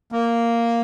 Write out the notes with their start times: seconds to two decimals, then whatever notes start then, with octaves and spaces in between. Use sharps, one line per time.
0.12 A#3